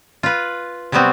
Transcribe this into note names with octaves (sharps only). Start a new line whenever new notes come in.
F4 B4
C3 F#3 G3 B3 C4 F#4